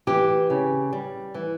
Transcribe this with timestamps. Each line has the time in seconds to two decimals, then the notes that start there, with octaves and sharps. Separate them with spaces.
0.07 E3 G4
0.50 C#3
0.93 G3
1.34 E3